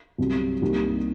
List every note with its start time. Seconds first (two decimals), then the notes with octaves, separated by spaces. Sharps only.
0.18 C2 C3 F#3 C4
0.62 C2 C3 G3 A#3 D#4